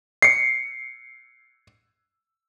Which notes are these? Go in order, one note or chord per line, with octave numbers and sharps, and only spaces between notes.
C7 C#7